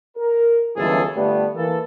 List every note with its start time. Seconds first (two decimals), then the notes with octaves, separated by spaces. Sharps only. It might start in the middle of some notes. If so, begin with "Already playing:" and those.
0.17 A#4
0.77 G1 C#2 F#2 E3 G#4 A4
1.15 G1 G2 G3 A3 B3
1.55 E3 A#3 A4